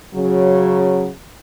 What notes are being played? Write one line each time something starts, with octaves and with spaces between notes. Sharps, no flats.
C#3 F#3